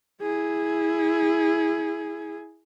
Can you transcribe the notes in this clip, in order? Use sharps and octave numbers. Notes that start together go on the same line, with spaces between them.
E4 G#4